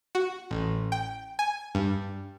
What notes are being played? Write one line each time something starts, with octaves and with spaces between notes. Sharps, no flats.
F#4
A1
G5
G#5
G2